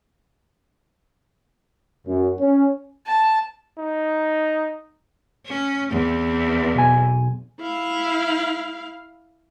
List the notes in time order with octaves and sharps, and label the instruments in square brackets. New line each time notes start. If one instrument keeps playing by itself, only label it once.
[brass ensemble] F#2
C#4
[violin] A5
[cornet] D#4
[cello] C#4
E2 C4
[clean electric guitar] B1 G#5
[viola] E4 F5